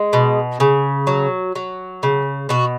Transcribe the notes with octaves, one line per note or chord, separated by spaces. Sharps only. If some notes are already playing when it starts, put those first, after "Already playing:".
Already playing: G#3
B2
C#3
F#3
F#3
C#3
B2 F#4